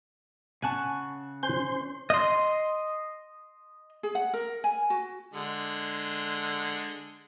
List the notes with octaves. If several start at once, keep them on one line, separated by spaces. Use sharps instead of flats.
C#3 F#5 G#5 A5 C#6
C#4 C5 C6
D#5 C6
G#4
F#5
A#4
G#5
F#4
D3 G#3